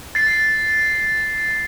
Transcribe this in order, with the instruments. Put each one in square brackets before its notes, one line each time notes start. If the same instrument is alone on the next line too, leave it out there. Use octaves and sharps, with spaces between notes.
[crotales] A6 C7